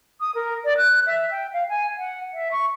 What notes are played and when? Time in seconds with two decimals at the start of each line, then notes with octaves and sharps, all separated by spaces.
0.20 D#6
0.35 A#4
0.65 D5
0.77 F#6
1.07 E5
1.31 G5
1.53 F5
1.69 G#5
1.97 F#5
2.34 E5
2.52 C#6